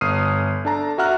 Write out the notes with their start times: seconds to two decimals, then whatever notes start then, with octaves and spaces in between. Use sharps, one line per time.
0.01 G1 D#6 F6 C7 D#7
0.65 D4 A4 A5 A#5
0.98 F#4 E5 F#5 A#5 F6 F#6